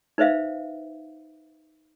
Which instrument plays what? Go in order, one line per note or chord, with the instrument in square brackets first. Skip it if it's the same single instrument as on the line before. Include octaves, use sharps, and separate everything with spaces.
[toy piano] D#4 B4 C5 E5 F5